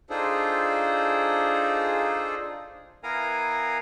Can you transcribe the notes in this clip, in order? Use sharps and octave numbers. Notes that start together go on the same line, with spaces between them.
D4 D#4 F4 G#4 A4 C5
B3 E4 A#4 F5 G#5 A#5